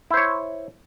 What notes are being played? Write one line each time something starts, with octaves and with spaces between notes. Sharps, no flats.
E4 C5 C#5